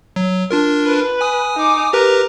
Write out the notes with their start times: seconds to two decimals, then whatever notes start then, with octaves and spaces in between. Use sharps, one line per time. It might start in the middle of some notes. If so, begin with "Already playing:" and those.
0.16 F#3
0.51 D4 F4 A#4
0.86 B4
1.21 G#5 D#6
1.56 D#4 D6
1.93 G4 A#4 B4 A#5